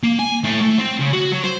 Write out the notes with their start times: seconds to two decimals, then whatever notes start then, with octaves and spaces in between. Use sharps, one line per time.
0.03 A#3
0.19 G#5
0.44 A2
0.61 A3
0.78 C4
1.00 C#3
1.13 F#4
1.32 F#3
1.44 C5